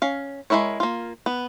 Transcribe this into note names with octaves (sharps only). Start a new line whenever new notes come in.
C#4 F5
G#3 A#3 E4 A#4 C#5
A#3 F4
B3